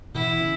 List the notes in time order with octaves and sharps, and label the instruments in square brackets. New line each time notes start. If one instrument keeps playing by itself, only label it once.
[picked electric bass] B2 E3 [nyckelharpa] E4
[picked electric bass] C#3